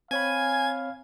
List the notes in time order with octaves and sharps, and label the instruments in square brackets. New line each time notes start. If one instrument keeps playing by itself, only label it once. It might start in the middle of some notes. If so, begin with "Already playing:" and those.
[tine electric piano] C4 C#5 B5 [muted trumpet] F5 [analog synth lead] G#5 [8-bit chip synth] G#6